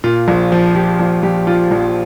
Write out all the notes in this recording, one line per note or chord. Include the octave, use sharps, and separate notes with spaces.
A#2 F4
A#1
F3
F3 G4
A#1
A#1 G4
F3 F4
A#1